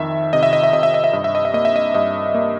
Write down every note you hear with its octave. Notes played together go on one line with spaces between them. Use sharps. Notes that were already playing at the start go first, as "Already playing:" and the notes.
Already playing: F2 D#3 E5
C3 D#5
E5
D#5
E5
C3 D#5
E5
D#5
E5
G2 D#5
E5
D#5
E5
A#3 D#5
E5
D#5
G2 D#5
A#3